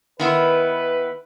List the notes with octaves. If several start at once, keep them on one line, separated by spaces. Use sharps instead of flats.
D#3 B3 E4 B4